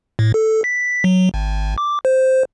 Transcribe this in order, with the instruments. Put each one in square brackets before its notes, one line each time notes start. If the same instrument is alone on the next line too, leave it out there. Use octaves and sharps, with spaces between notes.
[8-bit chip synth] A2
A4
B6
F#3
G#1
D6
C5